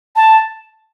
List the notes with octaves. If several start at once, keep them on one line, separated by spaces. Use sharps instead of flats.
A5